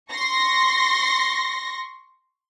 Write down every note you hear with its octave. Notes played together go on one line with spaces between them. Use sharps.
C6 C#6 A#6